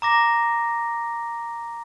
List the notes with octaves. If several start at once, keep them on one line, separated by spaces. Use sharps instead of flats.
A#5 D6 A#6